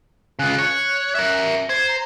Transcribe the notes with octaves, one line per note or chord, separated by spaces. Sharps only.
C#3 F4 F#6
C#5
A#4 E5
C5 G#6
A#5